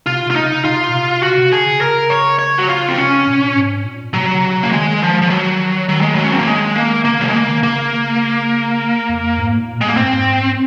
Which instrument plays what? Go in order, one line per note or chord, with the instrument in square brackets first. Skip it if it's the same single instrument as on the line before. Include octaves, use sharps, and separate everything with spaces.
[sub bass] C3 [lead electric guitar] F4
[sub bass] C3 [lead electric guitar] F4
[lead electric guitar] D#4
[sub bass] C#3
[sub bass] C3 [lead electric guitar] F4
[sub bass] A#2
C3
[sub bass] C#3 [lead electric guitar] F#4
[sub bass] C3
[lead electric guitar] G#4
[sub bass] C#3
[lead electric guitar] A#4
C#5
C#5
F#4
F4
C4
[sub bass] C3 [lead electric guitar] C#4
[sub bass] A#2
G#2
A#2
[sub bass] C3 [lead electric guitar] F#3
[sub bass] C#3
C3
C#3
[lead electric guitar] A#3
[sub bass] D#3 [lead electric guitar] G#3
[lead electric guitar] F3
F3
F#3
[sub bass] D#3 [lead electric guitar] F#3
[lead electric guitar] G#3
F#3
C#4
C4
A#3
G#3
A#3
[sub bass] C#3 [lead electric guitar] A#3
[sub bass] C3 [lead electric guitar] F#3
[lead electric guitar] G#3
[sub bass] C#3 [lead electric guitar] A#3
[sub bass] D#3
[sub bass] C#3 [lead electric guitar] A#3
[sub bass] F2
G#2
A#2
[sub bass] A#2 [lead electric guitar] G#3
[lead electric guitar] A#3
[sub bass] G#2 [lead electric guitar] C4
[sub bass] F#2
G#2